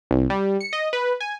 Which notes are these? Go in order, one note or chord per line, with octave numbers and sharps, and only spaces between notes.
C2
G3
C#7
D#5
B4
G#5